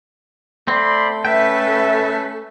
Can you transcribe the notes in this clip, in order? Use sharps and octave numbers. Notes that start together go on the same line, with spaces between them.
A3 C4 D5 B5 C6
C#4 A4 B4 E5 G5